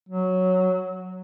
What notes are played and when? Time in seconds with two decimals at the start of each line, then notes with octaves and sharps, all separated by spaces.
0.09 F#3